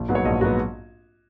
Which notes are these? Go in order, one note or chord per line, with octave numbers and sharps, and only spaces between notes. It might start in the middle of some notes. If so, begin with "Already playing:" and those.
Already playing: A#1
G#2 F#3 B3
C#5
A#1 D#5
G#2 F#3 B3 F#4